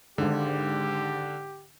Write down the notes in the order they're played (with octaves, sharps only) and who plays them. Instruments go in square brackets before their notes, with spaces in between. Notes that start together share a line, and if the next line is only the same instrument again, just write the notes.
[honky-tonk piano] G#1 G#2 [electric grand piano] D3 [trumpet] G4